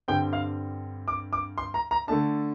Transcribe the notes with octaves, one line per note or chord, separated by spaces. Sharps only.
G2 D3 G3 C4 G5
F5
D6
D6
C6
A#5
A#5
D3 A3 D4 A5